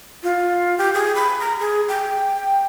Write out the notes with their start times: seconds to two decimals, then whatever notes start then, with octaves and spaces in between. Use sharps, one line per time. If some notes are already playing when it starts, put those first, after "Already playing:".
0.23 F4
0.78 G4
0.94 G#4
1.15 B5
1.40 A#5
1.60 G#4
1.88 G5